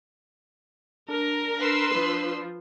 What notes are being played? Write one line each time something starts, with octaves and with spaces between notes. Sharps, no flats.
D4 A#4
B4 C6 E6
F3